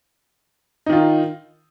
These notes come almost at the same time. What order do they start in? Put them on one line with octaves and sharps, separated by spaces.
D#4 D#3 F4